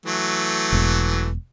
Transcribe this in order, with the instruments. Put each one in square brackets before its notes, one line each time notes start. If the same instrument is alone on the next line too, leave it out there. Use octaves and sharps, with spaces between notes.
[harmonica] E3 F#3 A3
[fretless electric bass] E1